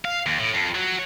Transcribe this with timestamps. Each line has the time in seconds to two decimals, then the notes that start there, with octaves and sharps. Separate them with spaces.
0.05 F5
0.26 D#2
0.39 A2
0.54 F2
0.75 F#3